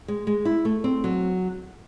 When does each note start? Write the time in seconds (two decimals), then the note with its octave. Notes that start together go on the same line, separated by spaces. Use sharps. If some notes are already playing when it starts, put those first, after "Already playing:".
0.08 G#3
0.27 G#3
0.45 E4
0.65 A3
0.84 C4
1.04 F#3